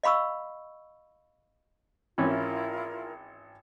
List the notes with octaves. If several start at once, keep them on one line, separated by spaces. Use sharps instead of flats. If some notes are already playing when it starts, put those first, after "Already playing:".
D#5 F5 B5 C#6 E6
G#1 E3 C#4 E4 F4 A#4